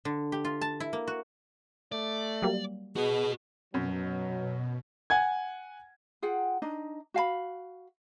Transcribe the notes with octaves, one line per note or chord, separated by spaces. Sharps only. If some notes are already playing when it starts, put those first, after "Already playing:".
D3
G4
F4
A5
E4
A#3
F#4
A3 D5
F#3 G3 A#3
B2 F#4 G#4 D#5
F#2 B2 F#3
F#5 G#5 G#6
F4 G#4 F#5 G5
D4 D#4 D#5
F#4 F5 G#5 B5